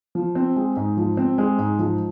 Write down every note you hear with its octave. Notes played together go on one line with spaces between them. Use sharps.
F3
C4
G#3
G#2
F3
C4
G#3
G#2
F3